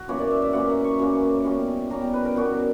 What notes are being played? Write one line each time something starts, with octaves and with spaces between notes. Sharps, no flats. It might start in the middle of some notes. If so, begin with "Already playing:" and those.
Already playing: F#4
F#2 E3 A#3 C#4 C#5
D5
E5
E5
F#2 E3 A#3 C#4 F#5
A#5
C#6
F#2 E3 A#3 C#4
B2 G3 C#4
B2 G3 C#4 A#5
G5
B4
A#4
B2 G3 C#4 F#4
A#4